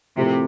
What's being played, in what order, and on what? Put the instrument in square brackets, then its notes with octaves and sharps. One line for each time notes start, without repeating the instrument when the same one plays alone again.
[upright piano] A2 F3 A3 E4 A#4 [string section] C3